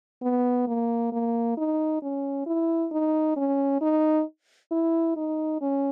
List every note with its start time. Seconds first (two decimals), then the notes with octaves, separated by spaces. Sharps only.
0.22 B3
0.68 A#3
1.12 A#3
1.57 D#4
2.03 C#4
2.46 E4
2.92 D#4
3.37 C#4
3.81 D#4
4.72 E4
5.16 D#4
5.62 C#4